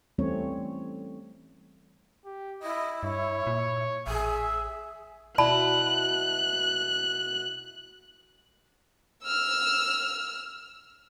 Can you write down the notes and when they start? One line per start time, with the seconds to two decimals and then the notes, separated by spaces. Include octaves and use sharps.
0.18 E3 G3 A3 C4 C#4 C#5
2.26 G4
2.62 E4 D#5
3.03 G2 C#5
3.47 A#2
4.07 A1 G#4 E5
5.38 B2 E4 F#4 D5 A5 B5 F#6
9.24 E6 F6